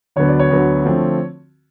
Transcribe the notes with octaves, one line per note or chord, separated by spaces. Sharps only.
D2 D3 F#3 B3 C#5
D5
C#5
D2 D3 F#3 B3
D3 F3 A3 C4